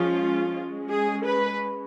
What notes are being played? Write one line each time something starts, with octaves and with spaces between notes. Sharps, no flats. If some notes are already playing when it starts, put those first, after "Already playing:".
Already playing: F3 G#3 C#4 F4
G#3 C#4
G#4
B4